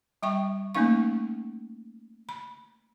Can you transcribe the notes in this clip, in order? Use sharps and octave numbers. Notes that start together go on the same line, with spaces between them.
G3 E5 G5 C#6
A3 A#3 C#4 D#4 F5 C#6
B5